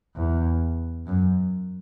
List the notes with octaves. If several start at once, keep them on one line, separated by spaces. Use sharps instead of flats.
E2
F#2